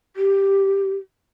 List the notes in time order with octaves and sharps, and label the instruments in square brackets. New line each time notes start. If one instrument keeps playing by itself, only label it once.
[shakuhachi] G4